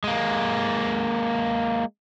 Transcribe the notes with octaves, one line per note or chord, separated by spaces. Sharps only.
G#3 A#3